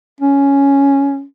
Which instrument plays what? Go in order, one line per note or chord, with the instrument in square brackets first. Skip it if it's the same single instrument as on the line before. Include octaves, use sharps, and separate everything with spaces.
[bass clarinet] C#4